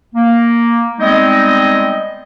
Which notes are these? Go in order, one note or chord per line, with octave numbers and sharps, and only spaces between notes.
A#3
G3 G#3 B3 C4 D#4 D#5